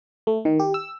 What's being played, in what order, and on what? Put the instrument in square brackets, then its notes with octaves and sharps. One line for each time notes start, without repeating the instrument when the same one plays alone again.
[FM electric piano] A3
D#3
G4
E6